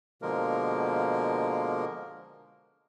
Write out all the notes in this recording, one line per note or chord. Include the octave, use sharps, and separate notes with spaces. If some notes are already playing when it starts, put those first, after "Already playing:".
B2 D3 F3 G#3 A#3 A#4